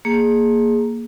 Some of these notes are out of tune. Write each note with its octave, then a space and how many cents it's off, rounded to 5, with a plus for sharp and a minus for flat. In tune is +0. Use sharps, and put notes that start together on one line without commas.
A#3 -5 G#4 +0